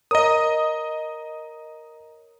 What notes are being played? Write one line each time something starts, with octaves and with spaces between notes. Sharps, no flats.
A#4 C#5 D#5 A#5 D#6